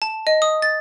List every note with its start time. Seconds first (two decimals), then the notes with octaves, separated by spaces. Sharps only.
0.02 A5
0.27 D#5
0.42 D#6
0.62 A6